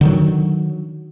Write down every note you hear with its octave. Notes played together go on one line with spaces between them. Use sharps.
D3 D#3 F#3